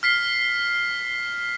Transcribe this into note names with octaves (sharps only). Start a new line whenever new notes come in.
F6 B6 C7